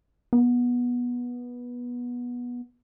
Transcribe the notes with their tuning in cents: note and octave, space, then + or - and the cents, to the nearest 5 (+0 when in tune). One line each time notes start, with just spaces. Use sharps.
B3 -20